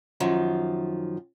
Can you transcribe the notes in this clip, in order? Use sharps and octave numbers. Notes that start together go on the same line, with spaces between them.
F#2 D#3 F3